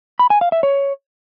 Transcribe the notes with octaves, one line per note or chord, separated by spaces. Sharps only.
B5
G#5
F5
E5
C#5